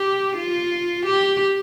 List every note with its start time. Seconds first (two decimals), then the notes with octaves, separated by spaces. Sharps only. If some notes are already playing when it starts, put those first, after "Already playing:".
Already playing: G4
0.37 F4
1.06 G4